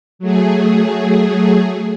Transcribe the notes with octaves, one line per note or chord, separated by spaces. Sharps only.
F#3 A3 G#4